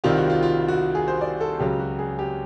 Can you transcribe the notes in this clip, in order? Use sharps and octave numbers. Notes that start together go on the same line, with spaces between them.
C2 C3 D#3 G3 C4 F4
F#4
F4
F4
F#4
G#4
C5
D5
A4
C#2 C#3 F#3 G4
F#4
G#4
G4